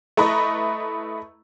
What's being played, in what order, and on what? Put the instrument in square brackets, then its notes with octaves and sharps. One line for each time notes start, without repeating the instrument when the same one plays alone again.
[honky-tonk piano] A3 E4 B4 D#5 A#5